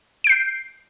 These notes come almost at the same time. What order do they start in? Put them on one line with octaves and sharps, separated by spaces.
D7 G6 C7